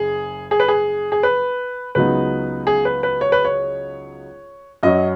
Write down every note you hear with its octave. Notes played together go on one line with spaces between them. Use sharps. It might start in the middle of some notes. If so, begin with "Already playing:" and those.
Already playing: F#1 G#4
G#4
B4
G#4
G#4
B4
C#2 C#3 F#3 B3 D#4 B4
G#4
B4
B4
C#5
B4
C#5
F#2 F#3 C#4 D#5